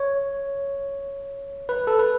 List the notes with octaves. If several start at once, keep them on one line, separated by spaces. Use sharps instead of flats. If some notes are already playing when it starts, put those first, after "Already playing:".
Already playing: C#5
B4
A4
B4